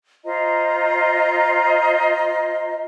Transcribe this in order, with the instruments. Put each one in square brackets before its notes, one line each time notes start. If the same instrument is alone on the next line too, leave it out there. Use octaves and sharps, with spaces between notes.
[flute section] F4 C5 D#5 A#5